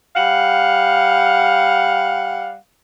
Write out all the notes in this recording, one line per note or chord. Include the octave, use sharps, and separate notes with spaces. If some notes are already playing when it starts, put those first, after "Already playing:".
G3 F5 F#5